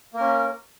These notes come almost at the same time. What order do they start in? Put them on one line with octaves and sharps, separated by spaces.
A#3 A#4 C#4